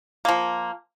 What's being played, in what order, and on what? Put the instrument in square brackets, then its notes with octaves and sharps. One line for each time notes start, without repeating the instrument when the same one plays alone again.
[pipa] F3 A#3